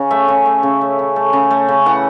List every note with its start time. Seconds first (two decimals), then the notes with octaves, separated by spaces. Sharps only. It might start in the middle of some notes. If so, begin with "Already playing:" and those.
Already playing: C#3
0.11 A3 E5
0.28 C#3
0.46 A3
0.63 C#3
0.81 A3
0.99 C#3
1.16 A3
1.33 C#3
1.51 A3
1.69 C#3
1.86 E3 F#5